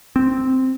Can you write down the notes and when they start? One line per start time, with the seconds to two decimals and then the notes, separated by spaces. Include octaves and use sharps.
0.16 C4